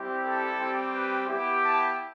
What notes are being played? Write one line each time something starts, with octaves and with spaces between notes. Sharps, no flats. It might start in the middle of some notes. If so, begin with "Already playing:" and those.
Already playing: G3 C4 E4 G4
A4
G3 C4 G4
B4
B3 E4 G4
A5